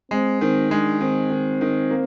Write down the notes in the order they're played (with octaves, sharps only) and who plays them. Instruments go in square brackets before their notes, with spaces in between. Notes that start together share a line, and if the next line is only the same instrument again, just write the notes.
[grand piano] G#3 [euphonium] C4
[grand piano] D#3 [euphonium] C4
[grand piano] G#3 [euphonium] D4
[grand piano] D#3 [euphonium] C4
[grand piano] D#3
D#3
A#3